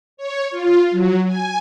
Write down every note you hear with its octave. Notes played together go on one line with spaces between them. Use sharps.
C#5
F4
F#3
G#5